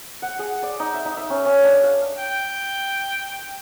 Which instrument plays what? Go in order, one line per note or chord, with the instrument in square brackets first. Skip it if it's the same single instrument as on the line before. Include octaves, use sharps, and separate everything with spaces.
[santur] F#5
G#4
D5
D#4
E5
D#4
E5
C#4
C#4
D4
F5
[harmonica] G5